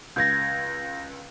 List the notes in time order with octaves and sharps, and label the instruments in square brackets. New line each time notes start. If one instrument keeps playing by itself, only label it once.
[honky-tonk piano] C#2 G#6 [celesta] G6 A#6